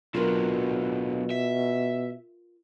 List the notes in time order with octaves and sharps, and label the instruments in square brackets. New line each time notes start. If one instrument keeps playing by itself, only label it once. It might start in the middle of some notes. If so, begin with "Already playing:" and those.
[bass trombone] B2 [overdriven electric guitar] D3 F#3 [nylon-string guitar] F4 A#4 B4
[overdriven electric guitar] E5